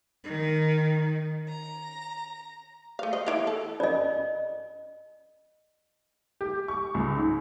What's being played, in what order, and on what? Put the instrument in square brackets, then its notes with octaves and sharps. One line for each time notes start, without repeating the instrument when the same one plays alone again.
[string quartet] D#3
A#5
[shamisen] A3 F5
C5 D#5
E3 E4 F5
A4
[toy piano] D5 D#5
[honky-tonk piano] G4
C#6
C#2
G#2